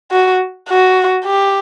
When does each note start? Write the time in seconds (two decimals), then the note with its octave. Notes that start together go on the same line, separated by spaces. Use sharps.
0.12 F#4
0.69 F#4
1.25 G4